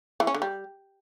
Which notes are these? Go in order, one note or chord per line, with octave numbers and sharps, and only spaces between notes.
E3
C#4
D3
G3